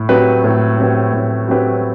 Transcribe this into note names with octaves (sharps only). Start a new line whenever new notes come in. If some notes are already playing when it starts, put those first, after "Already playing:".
Already playing: A2
F#3 C4 G4 B4
A2
F#3 C4 G4 B4
A2
F#3 C4 G4 B4